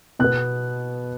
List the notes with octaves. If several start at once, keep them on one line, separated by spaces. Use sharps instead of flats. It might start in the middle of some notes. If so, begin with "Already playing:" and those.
B2 B3 F#6